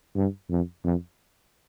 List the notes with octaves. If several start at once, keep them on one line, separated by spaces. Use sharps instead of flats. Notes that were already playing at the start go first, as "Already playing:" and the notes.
G2
F2
F2